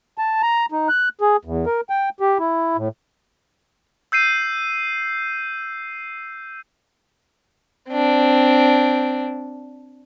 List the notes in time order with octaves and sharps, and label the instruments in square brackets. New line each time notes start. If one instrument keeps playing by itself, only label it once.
[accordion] A5
A#5
D#4
F#6
G#4
E2
A#4
G5
G4
E4
A2
[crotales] E6 G6 C7 D#7
[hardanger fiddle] C4 D4